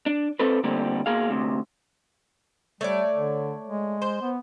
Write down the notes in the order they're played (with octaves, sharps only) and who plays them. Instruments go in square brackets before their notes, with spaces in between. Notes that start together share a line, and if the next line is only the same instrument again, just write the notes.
[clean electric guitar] D4
C4 A4 B4
D3 G3 A3 A#3 C4
B2 A#3 G#4 F5
D2 C3
[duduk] G3 [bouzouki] A3 C#5 D5
[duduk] D3
G#3
[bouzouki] C5
[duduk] B3